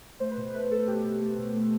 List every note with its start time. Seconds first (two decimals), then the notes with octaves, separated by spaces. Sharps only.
0.20 A3 C5
0.31 B4
0.37 B2 C5
0.54 A3 B4
0.70 A3 A4
0.88 B2 G4
1.05 B2
1.21 A3
1.38 B2
1.54 A3